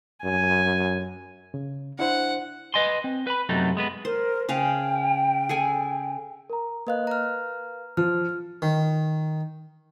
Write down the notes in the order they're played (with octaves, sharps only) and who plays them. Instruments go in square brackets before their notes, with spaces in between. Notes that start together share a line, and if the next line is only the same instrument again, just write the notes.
[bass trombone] F#2 [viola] G#5
[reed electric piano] C#3
[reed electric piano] D4 E4 C5 [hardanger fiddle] F#5
[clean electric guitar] B4 C5 D#5 G#5 C6
C4
B4 B5
F#2 C3 F#3 A3 B3 D#4
G#3 B3 B4
[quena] A#4 [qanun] C5
[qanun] C#3 G#4 F5 [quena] G5
[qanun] G#4 A4 G#5
[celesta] A#4 A#5
[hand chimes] A#3 D#5 F#6 [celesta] A#4 B4 F5
[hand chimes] A#5 F6
[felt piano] F3 [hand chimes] F6
[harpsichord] D#3